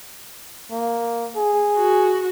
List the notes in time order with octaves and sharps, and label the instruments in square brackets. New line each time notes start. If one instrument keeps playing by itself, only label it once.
[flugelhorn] A#3
G#4
[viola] F#4